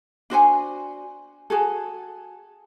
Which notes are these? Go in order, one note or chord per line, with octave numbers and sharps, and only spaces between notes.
D4 F#4 C5 G#5
F#4 G#4 A4